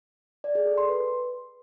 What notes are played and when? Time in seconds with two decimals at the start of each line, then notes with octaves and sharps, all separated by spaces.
0.44 D5
0.55 G#4
0.66 A4
0.78 C6
0.89 B4